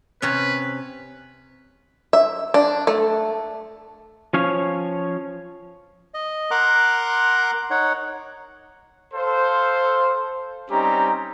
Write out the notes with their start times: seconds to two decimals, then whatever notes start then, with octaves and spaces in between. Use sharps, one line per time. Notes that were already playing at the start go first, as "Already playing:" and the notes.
0.22 C3 C#4 B4
2.13 E5
2.54 D4
2.87 A3
4.33 F3 C#4 C#5 F5
6.14 D#5
6.51 A#4 F#5 A#5 C6 D6 F#6
7.71 D#4 C#5 F#5
9.14 A4 C5 F5
10.70 G3 C4 C#4 D#4 G4 A#5